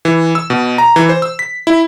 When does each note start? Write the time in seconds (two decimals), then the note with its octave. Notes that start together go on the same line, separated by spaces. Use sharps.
0.05 E3
0.35 E6
0.50 B2
0.78 A#5
0.96 E3
1.09 C5
1.22 E6
1.39 B6
1.67 E4